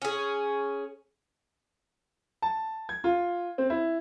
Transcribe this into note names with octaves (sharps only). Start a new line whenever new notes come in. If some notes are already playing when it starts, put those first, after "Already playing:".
C#4 G#4
A5
G#6
F4
C4
E4